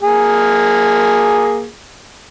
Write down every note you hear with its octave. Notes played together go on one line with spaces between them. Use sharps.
A#3 G#4